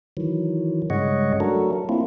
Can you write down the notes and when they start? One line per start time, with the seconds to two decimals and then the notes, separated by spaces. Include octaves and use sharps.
0.17 D#3 E3 F#3
0.90 G2 C#3 G#3 C#5 D#5 F#5
1.40 F#3 A3 D4 F#4 A4 A#4
1.73 F#3
1.89 A3 A#3 C4 E4 F4